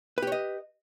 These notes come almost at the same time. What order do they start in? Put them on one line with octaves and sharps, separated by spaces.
B4 G4 C#5 D#5